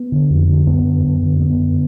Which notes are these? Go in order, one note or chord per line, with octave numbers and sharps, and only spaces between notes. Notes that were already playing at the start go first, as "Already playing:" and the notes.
Already playing: B3
D3
F2
D3
F#2 B3
D3
F#2
D3
F#2 B3
D3